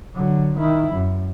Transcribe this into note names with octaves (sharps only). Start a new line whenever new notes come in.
D3 F#3
D#3 E4
F#2